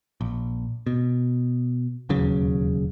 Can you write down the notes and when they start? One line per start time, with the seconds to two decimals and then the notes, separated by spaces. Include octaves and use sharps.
0.21 A#1
0.87 B2
2.09 E1 D#2 C#3 F#3